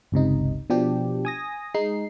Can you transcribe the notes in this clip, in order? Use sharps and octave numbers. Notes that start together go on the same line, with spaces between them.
G1 C#2 C3 D#4
B2 F3 D4 G4
G#5 D#6 A#6
G#3 D#4 C7